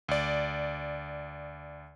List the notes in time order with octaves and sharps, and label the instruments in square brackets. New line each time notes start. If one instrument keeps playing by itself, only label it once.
[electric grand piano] D2 D5